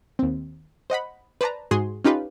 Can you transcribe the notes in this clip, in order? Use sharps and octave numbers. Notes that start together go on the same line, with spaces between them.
D#2 C4
C5 D#5 F#5 B5
B4 C5 D5 A5 A#5
G#2 F#4 G#4 C6
C#4 D#4 F4 G4 B4